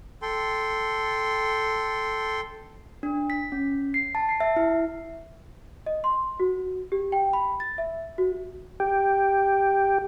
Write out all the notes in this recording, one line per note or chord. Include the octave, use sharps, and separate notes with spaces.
A4 G5 C6
D4
B6
C#4
C7
A5
C7
E5
E4
D#5
C6
F#4
G4
G5
B5
A6
E5
F#4
G4